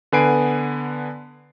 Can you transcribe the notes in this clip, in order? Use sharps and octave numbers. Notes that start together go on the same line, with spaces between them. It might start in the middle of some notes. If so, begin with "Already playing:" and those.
D3 B3 B4 G#5 C7 D7